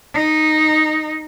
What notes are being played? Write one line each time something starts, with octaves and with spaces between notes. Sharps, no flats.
D#4